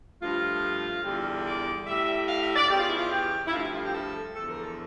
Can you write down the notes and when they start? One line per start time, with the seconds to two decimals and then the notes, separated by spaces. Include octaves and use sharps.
0.21 G2 F3 A3 F4
1.03 E2 D3 G3
1.45 D5
1.87 A2 G3 E5
2.27 F5
2.42 E5
2.56 D5
2.69 E2 C#3 E3 G4
2.78 F4
2.89 E4
2.98 F4
3.11 G4
3.46 E4
3.52 G2 F3 A3 F4
3.62 E4
3.74 F4
3.84 G4
3.93 A4
4.35 E2 D3 F3 A4
4.49 A#4
4.63 A4